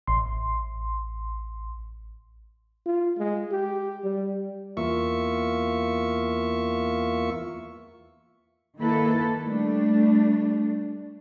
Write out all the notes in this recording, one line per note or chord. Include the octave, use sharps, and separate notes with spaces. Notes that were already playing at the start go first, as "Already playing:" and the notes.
A1 C6
F4
G#3
G4
G3
E2 A#3 F4 E5 C#6
D#3 A#3 E4 A4 B4
G3 A3 D4